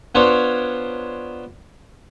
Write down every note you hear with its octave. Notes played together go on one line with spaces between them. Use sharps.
B3 D4 F4 C5 C#5